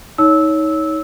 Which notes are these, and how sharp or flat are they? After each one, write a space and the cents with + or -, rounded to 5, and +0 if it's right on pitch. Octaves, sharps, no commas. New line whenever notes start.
D#4 +25 C#5 +15 E6 -15